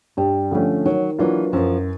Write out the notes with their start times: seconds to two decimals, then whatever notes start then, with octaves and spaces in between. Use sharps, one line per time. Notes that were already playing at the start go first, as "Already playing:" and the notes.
0.17 G2 G3
0.51 D3 F3 A3 C#4
0.85 D#3 F#3
1.19 E3 F#3 A#3 D4 F4
1.53 F#2 F3